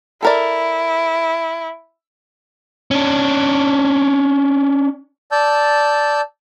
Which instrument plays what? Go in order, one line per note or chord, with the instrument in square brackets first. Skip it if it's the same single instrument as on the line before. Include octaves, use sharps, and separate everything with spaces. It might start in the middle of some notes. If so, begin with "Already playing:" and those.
[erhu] E4 [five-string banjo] A4 A#4 D5
[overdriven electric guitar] C#4 D4
[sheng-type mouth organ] D5 A5 E6 G6